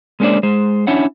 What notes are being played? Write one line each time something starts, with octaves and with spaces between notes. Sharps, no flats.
G#3 A#3 C#4 D4 C5 D5
G#3 C5
C#4 D4 E4 C#5 F#5